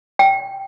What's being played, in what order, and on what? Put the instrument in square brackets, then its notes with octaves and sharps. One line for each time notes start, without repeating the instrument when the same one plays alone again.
[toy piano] G5